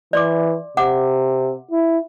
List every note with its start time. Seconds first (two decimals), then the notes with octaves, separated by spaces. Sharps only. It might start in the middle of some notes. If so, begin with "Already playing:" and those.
0.13 E3 D5 C6 D6
0.77 C3 F#5 D6
1.71 E4